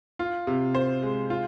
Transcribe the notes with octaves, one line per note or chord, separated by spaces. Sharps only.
F4
C3
C5
G#3
F4